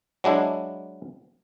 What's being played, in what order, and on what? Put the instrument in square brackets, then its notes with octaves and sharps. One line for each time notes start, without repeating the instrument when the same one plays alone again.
[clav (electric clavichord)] F#3 G#3 D4 E4